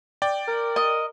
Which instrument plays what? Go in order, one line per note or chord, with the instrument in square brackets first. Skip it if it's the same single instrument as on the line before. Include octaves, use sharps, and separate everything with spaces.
[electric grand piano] D5 G5
[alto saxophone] A#4
[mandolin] D#5